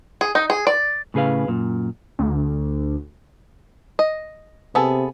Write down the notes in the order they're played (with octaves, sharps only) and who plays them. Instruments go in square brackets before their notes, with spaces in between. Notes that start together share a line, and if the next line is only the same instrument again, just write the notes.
[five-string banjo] G#4
D#4
G#4
D5
[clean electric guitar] A2 C#3 G#4 B4 F5
F#2 A#2
[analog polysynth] D2
[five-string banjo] D#5
[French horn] C3 [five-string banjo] B3 G#4 A4